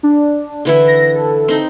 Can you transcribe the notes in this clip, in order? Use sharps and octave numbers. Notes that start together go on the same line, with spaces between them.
D4
D3 E3 E4
A#6
A4
C4 D#4